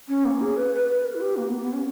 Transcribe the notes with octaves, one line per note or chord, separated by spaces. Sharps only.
C#4
A#3
G#4
B4
B4
B4
A#4
E4
G4
A#3
B3
B3
C#4